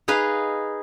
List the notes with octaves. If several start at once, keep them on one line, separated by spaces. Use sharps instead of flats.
D#4 G#4 B4 F5